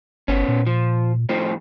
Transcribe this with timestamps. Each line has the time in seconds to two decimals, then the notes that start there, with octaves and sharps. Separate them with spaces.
0.28 G1 B3 C#4
0.48 A#2
0.66 F3
1.29 A2 F3 C4